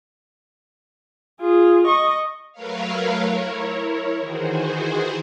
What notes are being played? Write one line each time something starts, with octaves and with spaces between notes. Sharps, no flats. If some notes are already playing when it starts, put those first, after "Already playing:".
F4 G#4
D#5 C#6
F#3 A3 A#4 B4 C#5 F5
E4 A#4 C#5
D#3 E3 F#4 G#4 C5